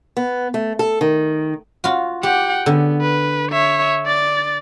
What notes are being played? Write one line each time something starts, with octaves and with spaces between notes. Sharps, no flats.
B3
A3
A4
D#3
F4 F#4
G4 F#5 G5
D3 B3
B4
C#5 E5
D5 A6